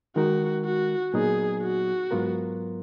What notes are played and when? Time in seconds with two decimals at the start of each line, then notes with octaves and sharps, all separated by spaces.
0.16 D#3 G#3 D#4 F#4 A#4
0.65 F#4
1.14 A#2 F#3 B3 D#4 G#4
1.62 F#4
2.11 G#2 F#3 B3 F4 A#4